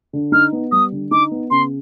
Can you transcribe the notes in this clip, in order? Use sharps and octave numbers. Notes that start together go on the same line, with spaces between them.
D3
D#4 F6
B3
G3 D#6
D3
D#4 D6
B3
C#3 C6